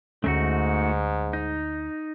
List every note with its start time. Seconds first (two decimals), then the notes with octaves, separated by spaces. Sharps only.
0.24 D2 G#2 A3 C#4 D#4 F#4
1.33 D#4